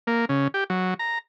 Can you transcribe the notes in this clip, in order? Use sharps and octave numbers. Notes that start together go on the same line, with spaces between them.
A#3
C#3
G4
F#3
A#5